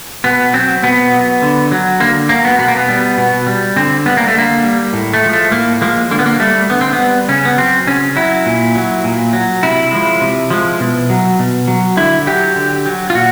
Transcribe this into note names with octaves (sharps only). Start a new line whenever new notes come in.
B2 B3
F#3 C4
B2 B3
F#3
D3
F#3
D3 A#3
F#3 A#3
B3
B2 B3
A#3
B3
G3
B2
G3
D3 C4
G3 B3
A#3
A3
D3 A#3
G3
A2
A3
F3 G#3
A3
A2 A#3
F3 G#3 A#3
D3 A#3
B3
A#3
G3 A3
D3 B3
C4
B3
G3
C#3 C#4
B3
F#3 C4
C#3 C#4
F#3 E4
A#2
F#3
A#2
F#3
C3 E4
F3 G#3
C3
F3 G#3
B2
F#3
B2
F#3
D3 E4
F#3 G4
D3
F#3
F4
A#2 F#4